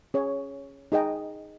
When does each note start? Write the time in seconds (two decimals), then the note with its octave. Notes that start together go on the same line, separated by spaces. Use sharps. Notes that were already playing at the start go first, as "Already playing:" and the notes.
0.14 C#4 G#4 C#5
0.92 D#4 G#4 D#5 G5